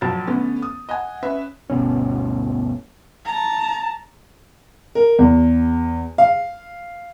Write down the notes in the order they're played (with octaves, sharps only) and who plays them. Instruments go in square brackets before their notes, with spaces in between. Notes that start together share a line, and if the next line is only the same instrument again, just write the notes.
[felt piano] A#1 F#3 A5 A6
D3 A3 B3 C#4
D#6
D#5 F#5 G#5
C#4 B4 E5
[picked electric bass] G1 D2 B2 C#4
[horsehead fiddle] A5 A#5
[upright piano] A#4
E2
F5